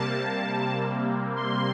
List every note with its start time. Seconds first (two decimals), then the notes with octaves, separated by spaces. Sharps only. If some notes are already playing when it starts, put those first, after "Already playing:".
Already playing: C3 G3 A#3 A5
1.36 C6